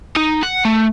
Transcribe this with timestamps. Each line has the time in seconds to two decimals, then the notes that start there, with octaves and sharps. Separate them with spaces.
0.17 D#4
0.43 F#5
0.65 A3